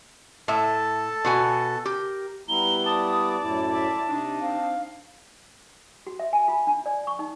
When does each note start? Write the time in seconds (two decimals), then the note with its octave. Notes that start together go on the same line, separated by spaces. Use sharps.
0.48 A2 A4 E5 A5
1.25 B2 F#4 G#5
1.85 G4 A#4
2.49 G3 B3 E4 A#5 G7
2.86 D5 A5 D#6
3.41 F#2 A2 E4
3.71 D5 E5
4.08 C3 D4 D#4
4.41 C4 F5
6.07 F#4
6.19 E5
6.33 G#5
6.48 F4
6.67 D4
6.86 D5
7.07 C#6
7.19 D#4